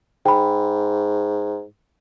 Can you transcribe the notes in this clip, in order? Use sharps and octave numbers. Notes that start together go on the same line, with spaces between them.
G#2 G5 B5